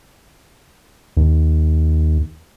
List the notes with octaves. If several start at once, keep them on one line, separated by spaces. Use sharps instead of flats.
D#2